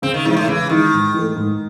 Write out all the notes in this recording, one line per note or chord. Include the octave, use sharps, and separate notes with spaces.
C#3 C4
D#3
C3 E3 G#3 D#4
A2
C#3 E3
D#3 E3 G#3 D#4
G#2
E3 A3
G#2